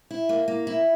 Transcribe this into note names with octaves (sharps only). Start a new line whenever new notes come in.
E4
A#3
A#3
E4